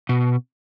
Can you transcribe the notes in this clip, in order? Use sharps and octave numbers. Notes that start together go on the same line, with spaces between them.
B2